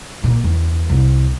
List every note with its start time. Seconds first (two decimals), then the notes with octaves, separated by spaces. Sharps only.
0.24 A#2
0.44 E2
0.89 C2